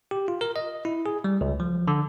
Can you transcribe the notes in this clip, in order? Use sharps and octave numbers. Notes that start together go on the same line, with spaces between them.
G4
F4
A#4
D#5
E4
G#4
G3
C#2
F3
D3